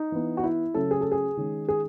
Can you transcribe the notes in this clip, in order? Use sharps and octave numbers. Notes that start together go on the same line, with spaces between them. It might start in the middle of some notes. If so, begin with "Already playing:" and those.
Already playing: D#4
E3 B3
F#4
E4
C#3 F#3 A3 C#4 A4
G#4
A4
G#4
D#3 G#3 C#4
G#4